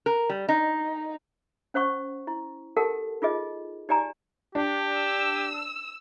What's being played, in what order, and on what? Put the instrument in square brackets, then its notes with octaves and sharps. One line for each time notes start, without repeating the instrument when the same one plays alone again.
[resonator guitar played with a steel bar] A#4
G3
D#4
[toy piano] C#4 C5 F#5 C#6
E4
G4 A4 A#4 F#5 A5
D#4 F4 G#4 D#5
D#4 G4 D5 G#5 A#5
[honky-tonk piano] D4 [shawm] G4
[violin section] E6